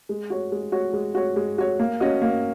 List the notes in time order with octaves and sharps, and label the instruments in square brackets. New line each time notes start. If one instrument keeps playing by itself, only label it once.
[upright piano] G#3
F#4 C#5
G#3
F#4 C#5
G#3
F#4 C#5
G#3
F#4 C#5
A#3
C#4 F#4 D#5
A#3